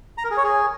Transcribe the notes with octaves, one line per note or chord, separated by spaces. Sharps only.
A#5
A#4
G#4
C#5
G#4